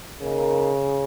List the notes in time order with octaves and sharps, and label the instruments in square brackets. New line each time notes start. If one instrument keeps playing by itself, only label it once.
[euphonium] C#3 [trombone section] A#3 D#4 A#4